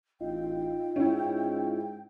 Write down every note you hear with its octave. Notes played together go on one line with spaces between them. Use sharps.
A1 D#4 F4 G5
G#2 C#4 E4